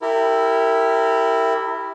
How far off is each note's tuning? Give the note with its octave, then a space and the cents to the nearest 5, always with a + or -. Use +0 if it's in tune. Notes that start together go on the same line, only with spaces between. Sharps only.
E4 +0 G4 +0 A#4 -30